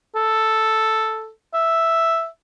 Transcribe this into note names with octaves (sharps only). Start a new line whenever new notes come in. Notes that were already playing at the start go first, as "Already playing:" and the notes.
A4
E5